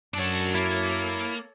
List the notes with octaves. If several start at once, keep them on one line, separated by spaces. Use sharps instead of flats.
F#2 D4 F#4 A4 C#5
A#3 E4